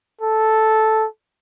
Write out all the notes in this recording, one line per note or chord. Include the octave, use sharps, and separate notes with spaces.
A4